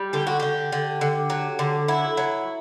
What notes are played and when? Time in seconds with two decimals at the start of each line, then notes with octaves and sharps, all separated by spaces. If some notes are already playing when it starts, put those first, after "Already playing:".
Already playing: G3
0.13 D3 G4
0.27 F#4
0.40 D3 G4
0.72 D3
1.01 D3
1.30 F#3
1.59 D3
1.88 F#3 E4
2.17 F#3